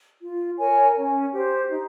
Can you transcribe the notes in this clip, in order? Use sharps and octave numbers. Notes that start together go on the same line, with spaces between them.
F4
A#4 C#5 G#5
C#4
G4 C5
D#4